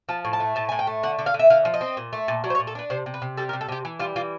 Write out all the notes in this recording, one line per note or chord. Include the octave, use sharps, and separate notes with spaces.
F3 A5
A2
A5
A3
A2 A5
A2 G#5
G5
A3
D3 F#5
D3
F5
D3
E5
D3 F5
F3
D#5
C4
A#2
A3
A#2
F#3 D5
C5
C#5
A#2
A4
D4 B4
C3 C5
C3
B4
C3
G3 A4
A#4
C3
A4
C3 G4
E3
G3 F4
E3 F4